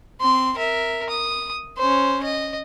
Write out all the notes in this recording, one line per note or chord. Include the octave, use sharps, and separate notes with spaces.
C4 C6
A#4 E5
D#6
C#4 C5
D#5